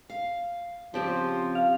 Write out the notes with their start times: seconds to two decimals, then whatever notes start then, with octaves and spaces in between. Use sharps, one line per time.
0.10 F5
0.94 C#3 F3 C4 G4
1.55 F5